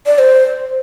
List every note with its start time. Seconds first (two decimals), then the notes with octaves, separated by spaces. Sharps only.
0.06 D5
0.19 C5